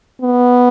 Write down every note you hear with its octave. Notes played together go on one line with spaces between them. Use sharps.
B3